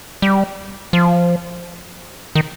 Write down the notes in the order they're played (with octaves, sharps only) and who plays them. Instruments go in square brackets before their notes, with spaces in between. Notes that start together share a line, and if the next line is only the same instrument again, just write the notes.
[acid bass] G3
F3
D#3